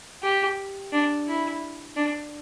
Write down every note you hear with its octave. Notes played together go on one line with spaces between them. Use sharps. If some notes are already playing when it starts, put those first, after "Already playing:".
G4
D4
E4
D4